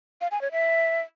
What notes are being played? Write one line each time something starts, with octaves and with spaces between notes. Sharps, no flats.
F5
G#5
C#5
E5